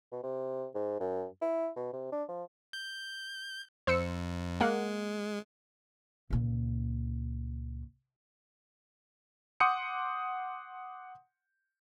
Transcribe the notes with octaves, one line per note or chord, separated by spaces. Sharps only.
B2
C3
G#2
F#2
E4
B2
C3
D4
F3
G6
F2 C5 E6 C#7
G#3 A#3 F#5
C#2 A#2
F#5 C6 D6 D#6 G6 C#7